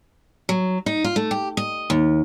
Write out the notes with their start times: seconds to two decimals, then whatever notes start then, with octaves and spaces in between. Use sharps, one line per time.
0.49 F#3
0.86 D#4
1.04 F4
1.16 A3
1.31 G4
1.57 D#5
1.90 D#2